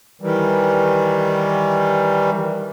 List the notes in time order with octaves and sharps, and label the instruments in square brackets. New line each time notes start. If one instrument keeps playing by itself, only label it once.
[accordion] D#3 E3 G3